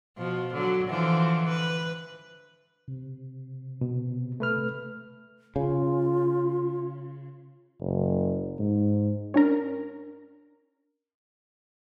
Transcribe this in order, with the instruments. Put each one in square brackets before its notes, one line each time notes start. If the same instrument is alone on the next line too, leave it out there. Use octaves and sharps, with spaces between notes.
[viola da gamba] B2 F3
D3 F#3
D3 E3 F3
B4
[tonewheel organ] C3
[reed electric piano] B2
A3 B4 F6
[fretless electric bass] C#3 [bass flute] F4
[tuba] F#1
G#2
[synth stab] C#4 D4 A#4